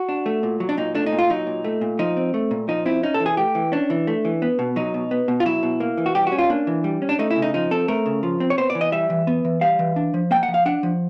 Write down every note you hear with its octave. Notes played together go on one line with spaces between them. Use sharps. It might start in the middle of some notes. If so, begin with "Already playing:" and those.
Already playing: F#4
D4
A3
A#2
F#3
D4
A#2 D#4
A3 D4
D#4
A#2
F4
F#3 D#4
A#2
A3
A#2
F3 D#4
C4
A3
A#2
F3 D#4
C4 E4
C#4 D#4
A4
E3
G#4
A3 G4
E3
C#4 D4
E3
A3
E3
B3
B2
F#3 D#4
B2
B3
B2
F4
F#3 E4
B2
A#3
E3
F#4
G3 G4
F#4
C#4
F4
A#3 D4
E3
G3
C#4
D4
A3 D#4
E4
C#3
D#4
F3 D#4
C4 A4
A3 A#4
C#3
F3
C4
C#5
B3 C5
D5
E3
D#5
G3 E5
E3
B3
E3
G3 F5
E3
D4
F3
A#3 G5
F#5
F3
F5
D4 F#5
F3